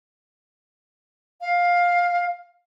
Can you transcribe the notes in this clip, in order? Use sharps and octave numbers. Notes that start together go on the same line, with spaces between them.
F5